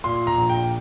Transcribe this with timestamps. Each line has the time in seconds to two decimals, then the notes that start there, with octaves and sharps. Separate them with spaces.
0.04 A#2 C6
0.27 A#5
0.38 A#1
0.49 G5